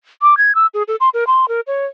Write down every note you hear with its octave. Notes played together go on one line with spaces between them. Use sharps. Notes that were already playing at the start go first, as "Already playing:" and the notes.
D6
G#6
E6
G#4
A4
C6
A#4
C6
A#4
C#5